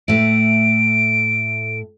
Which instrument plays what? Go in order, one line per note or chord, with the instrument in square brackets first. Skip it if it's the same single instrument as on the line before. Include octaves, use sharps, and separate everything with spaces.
[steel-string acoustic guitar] A2 A3 [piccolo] D7